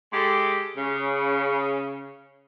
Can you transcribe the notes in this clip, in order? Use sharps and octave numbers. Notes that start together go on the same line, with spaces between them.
G#3 G4 A4
C#3